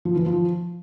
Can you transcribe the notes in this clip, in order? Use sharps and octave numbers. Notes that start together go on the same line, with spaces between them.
F3
E3
F3